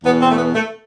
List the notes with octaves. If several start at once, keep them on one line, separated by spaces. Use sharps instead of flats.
E2 B2 B3
C4
A3
B3
A3